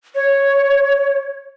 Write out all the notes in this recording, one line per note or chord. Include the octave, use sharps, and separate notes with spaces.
C#5